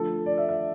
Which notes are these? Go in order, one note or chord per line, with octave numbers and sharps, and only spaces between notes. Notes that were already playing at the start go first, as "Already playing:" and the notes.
Already playing: D3 F3 A3 A4
D5
E5
E5